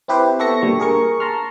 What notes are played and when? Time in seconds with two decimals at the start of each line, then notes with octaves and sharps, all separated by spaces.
0.08 C4 E4 G4 B4 C5
0.39 B3 A4 E5 C#6 A#6 C#7
0.62 A#2 D3 G3 C#6
0.80 G#4 A#4 C#6
1.20 A5 A#5 C6 F6